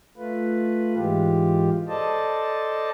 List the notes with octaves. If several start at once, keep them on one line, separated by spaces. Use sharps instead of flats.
A3 F4 B4
G#2 E3 G#3 F4 G4
A4 C5 D5 D#5 A5